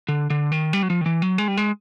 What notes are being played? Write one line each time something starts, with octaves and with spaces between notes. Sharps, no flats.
D3
D3
D#3
G3
F#3
F3
D#3
E3
F#3
G#3
G3
G#3